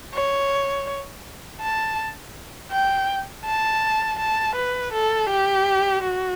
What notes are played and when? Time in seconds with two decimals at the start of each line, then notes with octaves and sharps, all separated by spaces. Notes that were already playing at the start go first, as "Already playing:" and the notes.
0.14 C#5
1.61 A5
2.71 G5
3.45 A5
4.19 A5
4.56 B4
4.93 A4
5.30 G4
6.03 F#4